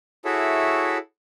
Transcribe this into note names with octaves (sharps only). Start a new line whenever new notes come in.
E4 F#4 G#4 A4 C#5 E5